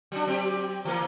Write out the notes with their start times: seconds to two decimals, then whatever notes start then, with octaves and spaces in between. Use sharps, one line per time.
0.12 F#3 D4
0.27 F#3 C4 G4
0.85 E3 A#3